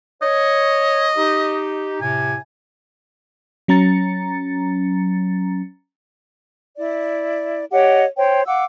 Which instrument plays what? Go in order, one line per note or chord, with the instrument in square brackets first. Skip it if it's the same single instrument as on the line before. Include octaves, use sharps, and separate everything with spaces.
[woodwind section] C#5 [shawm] D#5
[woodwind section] D#4 G4
[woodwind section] A2 C3 [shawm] G#5
[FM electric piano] F#3 C#4 A#5 A6 C#7
[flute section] E4 D5
G4 C#5 D#5 F#5
C5 C#5 G5
F5 F#5 D6 E6